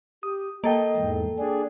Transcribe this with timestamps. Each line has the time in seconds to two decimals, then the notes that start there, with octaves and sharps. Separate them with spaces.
0.23 G4 D#6
0.64 A#3 A4 D#5 G5
0.96 E2 G#2
1.39 D4 G#4 D5